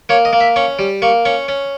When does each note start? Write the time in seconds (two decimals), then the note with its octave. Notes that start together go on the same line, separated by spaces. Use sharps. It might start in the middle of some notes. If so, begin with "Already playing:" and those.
0.09 A#3 C#5
0.25 D#5
0.33 A#3
0.40 E5
0.56 C#4 C#6
0.79 G3
1.02 A#3 C#6
1.25 C#4 C#6
1.48 C#4